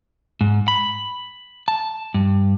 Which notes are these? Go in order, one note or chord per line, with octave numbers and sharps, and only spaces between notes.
G#2
B5
A5
G2